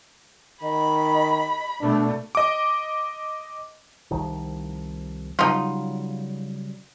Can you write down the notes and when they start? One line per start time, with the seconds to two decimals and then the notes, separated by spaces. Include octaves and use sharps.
0.63 D#3 D#5 B5
1.80 B2 A3 D4
2.35 D#5 D6
4.11 C2 D#3 F3
5.39 C#3 F#3 G3 D#4 F4